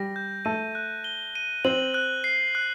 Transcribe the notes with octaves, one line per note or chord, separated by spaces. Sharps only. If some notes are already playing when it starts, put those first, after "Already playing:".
Already playing: G3 A#6
G6
A3 D#7
F#6
G7
D#7
C4 F#7
F#6
C7
F#6